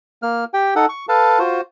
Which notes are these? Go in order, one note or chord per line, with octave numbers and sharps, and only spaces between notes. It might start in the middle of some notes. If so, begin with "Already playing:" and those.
A#3 F6
G4 G5
D#4 A4 F#5
C#6
A4 B4 F5 A5
F4 F#4 C5